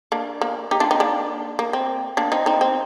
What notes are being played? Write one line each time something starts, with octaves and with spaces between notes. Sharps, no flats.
A#3 D4
A#3
D#4 G4
D4 F4
C4 D#4
A#3 D4
A#3
C4
A#3 D4
C4 D#4
C4 D#4
C4